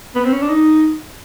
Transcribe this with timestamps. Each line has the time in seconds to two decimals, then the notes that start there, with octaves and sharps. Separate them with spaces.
0.15 B3
0.25 C4
0.32 C#4
0.42 D4
0.49 D#4